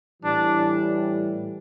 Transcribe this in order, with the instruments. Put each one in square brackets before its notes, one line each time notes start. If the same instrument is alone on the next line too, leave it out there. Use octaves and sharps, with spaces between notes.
[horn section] A2 E3 G3 D4